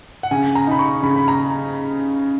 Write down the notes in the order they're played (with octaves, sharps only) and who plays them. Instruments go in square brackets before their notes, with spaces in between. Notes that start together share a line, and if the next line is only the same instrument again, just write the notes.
[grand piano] F#5
[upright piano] C#3 [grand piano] G#5
[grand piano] A#5
[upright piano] D#4 [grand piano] B5
[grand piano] C#6
[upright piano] C#3 [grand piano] B5
[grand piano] B5
A#5